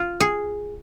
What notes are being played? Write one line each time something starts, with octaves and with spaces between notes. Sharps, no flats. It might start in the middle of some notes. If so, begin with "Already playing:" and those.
Already playing: F4
G#4